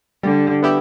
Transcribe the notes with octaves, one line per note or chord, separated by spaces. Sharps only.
D3 G3
B3 E4 G4